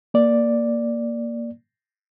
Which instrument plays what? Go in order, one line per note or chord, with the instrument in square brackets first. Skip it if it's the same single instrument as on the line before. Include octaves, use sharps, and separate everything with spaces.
[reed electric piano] A#3 D5